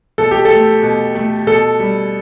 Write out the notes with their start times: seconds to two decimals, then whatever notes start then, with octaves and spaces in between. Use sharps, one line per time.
0.18 B2 A4
0.31 G4
0.45 A4
0.51 A3
0.83 B2
1.15 A3
1.47 B2 A4
1.80 G3